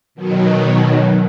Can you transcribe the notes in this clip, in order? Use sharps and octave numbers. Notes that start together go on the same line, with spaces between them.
B2 D#3 F#3